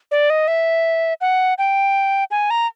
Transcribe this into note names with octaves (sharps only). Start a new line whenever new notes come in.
D5
D#5
E5
F#5
G5
G#5
A#5